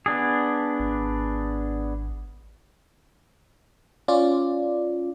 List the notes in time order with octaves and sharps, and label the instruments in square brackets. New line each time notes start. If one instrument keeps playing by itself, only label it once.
[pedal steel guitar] B3 D4 G#4
[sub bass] G#1
[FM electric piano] C#4 F4 D5